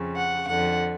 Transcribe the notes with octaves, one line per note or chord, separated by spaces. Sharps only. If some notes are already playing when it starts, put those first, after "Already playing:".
Already playing: F2 C#3
F#5
F2 D3 F#5